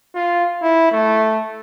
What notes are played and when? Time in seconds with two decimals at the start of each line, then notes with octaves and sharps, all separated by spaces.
0.15 F4
0.62 E4
0.92 A3